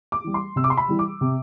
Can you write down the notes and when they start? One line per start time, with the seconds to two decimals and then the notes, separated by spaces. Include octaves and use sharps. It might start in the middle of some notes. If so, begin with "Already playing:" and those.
0.12 D6
0.24 E3 G3
0.34 C6
0.56 C3 E6
0.64 D6
0.70 C6
0.78 B5
0.88 E3 G3
0.99 D6
1.21 C3